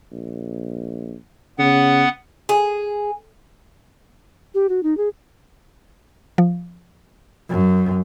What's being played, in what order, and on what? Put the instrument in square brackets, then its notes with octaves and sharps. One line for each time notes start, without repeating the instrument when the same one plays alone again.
[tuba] A#1
[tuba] C#3 [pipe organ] B3 F#5
[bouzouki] G#4
[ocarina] G4
F#4
D#4
G#4
[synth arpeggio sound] F3
[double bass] F#2